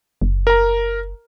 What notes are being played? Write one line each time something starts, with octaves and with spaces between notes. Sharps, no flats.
F#1
A#4 A#5